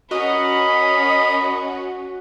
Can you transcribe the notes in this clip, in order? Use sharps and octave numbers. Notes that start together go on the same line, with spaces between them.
C#4 F#4 A#4 D#5 B5